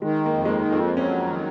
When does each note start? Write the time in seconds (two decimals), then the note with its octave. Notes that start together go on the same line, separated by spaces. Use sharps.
0.02 D#3 G#3
0.26 A#3
0.33 F2
0.45 G#3
0.49 A#3
0.65 F2
0.73 C4
0.96 F#3 C#4
1.28 D#3